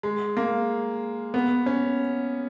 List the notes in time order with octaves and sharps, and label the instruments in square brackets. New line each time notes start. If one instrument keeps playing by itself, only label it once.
[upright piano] G#3
A#3
B3
C#4